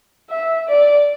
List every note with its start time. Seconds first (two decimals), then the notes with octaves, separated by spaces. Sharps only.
0.31 E5
0.69 D5